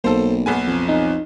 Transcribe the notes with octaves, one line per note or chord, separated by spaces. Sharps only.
B1 A#3 A4 C5
B1 B3 G#5
F2
D#4